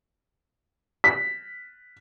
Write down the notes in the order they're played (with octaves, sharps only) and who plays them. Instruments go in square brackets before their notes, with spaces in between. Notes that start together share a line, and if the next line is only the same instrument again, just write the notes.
[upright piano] B6